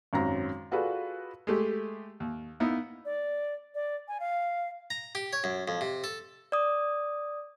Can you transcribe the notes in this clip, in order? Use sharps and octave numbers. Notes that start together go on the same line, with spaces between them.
G#1 F#2 F#3 C4 A#5 A#6
F4 F#4 G#4 A4 B4 D5
G#3 A3 G4
D#2
A#3 B3 D#4 E4
D5
D5
G#5
F5
A#5
G4
C#5
F#2
F2
C3
A4
D5 D#6